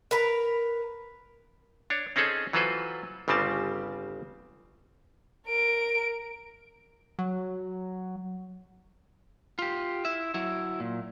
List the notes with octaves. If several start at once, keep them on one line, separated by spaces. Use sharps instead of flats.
A#4 B4 A#5
D4 C#5
C4 C#4 D#4 G#4 A4
E3 F#3 F4 A4 B4 C5
G1 C#3 G3 C4 A5
A#4 D7
F#3
F4 G4
E4 E5
F#3 E4
A#2